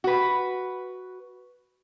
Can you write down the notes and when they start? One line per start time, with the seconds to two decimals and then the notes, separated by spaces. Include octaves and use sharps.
0.04 F#4 B4